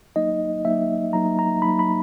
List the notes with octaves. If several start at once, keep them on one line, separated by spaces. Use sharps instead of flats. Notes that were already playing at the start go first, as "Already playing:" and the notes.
F#3 A#3 D#4 D#5
F#3 A#3 D#4 E5
F#3 A#3 D#4 A#5
A#5
F#3 A#3 D#4 B5
B5